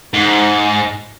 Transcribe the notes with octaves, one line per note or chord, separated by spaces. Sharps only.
G#2